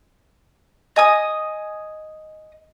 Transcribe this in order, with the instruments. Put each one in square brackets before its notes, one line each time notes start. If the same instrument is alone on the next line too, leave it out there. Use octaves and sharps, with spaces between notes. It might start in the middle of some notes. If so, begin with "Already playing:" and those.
[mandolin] D#5 G#5 D#6